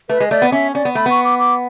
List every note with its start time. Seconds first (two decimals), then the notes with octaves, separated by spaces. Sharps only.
0.09 A3 B4
0.20 G#3
0.31 A3 D5
0.42 B3
0.52 C#4 E5
0.74 C#4 D5
0.85 B3
0.95 A3 B5
1.06 B3 C#6
1.25 D6
1.39 D6